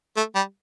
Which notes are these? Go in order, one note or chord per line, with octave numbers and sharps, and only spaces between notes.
A3
G3